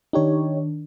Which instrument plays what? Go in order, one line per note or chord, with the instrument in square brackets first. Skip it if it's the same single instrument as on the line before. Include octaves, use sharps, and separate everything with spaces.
[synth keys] D#3 D4 [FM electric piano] D#4 G4 C#5